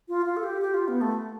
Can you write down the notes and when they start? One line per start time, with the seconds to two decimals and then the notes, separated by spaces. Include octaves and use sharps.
0.09 F4
0.26 F4
0.37 A4
0.43 G4
0.61 G4
0.74 F4
0.88 B3
1.01 A3